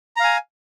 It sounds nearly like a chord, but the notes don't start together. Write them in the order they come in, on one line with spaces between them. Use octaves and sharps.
A#5 F5 G#5